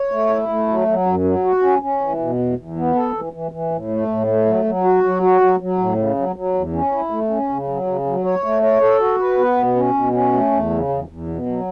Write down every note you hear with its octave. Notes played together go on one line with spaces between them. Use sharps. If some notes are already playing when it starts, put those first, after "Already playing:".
Already playing: C#5
A3
E4
A3
F#3
F#3
F#2
F#3
F#4
C#4
C#4
E3
B2
E2
E2
B3
A4
E3
E3
E3
A2
A3
A2
A3
F#3
F#3
F#4
F#3
F#4
F#3
F#3
A2
C#3
F#3
F#3
E2
C#4
E4
A3
C#4
C#3
F#3
C#3
F#3
C#5
A3
C#5
A4
F#4
B4
B3
B2
C#4
B2
C#4
A3
E2
C#3
E2
E2
B2
F#3